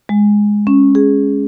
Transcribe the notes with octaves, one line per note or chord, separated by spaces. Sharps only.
G#3
C#4
G#4